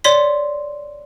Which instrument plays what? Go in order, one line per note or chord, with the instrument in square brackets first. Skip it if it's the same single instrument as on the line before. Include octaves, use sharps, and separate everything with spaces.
[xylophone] C#5 D5 C6 B6